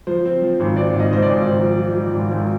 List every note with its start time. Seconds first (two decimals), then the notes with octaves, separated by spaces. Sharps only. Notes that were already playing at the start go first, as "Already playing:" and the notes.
0.07 F3 C5
0.25 C4
0.42 F3
0.60 G#1
0.76 C4 D5
0.93 G#2
1.00 D#5
1.11 G#2 C5
1.22 D5
1.28 G#1
1.45 G#1 C5
1.62 F3
1.79 F3
1.97 F3
2.14 G#1
2.31 G#1